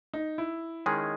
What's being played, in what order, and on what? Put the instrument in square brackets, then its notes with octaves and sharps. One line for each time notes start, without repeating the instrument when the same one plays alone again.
[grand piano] D#4
E4
[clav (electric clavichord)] D#3 G#3 C#4 G#4